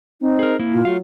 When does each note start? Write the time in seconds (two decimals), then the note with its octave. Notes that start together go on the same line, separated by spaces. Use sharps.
0.21 C4 D#4
0.39 G#4 A#4
0.59 A#3 E4
0.73 A#2 F4
0.85 F#3 A3 F5